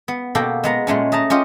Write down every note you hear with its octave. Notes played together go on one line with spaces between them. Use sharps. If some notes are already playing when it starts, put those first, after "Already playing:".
B3
B2 A#3 F#4 G4 A4 G5
G#3 B3 A#5
A#2 G#3 A3 C#4
A3 D#5 A5 A#5
C#4 F4 G4 D#5